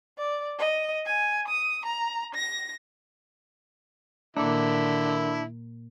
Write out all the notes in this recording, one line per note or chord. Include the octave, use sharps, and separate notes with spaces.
D5
D#5
G#5
D#6
A#5
A#6
A#2 D3 D#3 A#3 D4 E4